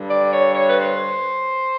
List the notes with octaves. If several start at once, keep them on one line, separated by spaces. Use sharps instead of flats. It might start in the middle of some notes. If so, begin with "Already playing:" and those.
Already playing: G2 D3 G3
D5
C#5
C#5
B4
C5